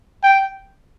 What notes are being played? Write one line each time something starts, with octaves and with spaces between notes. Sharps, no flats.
G5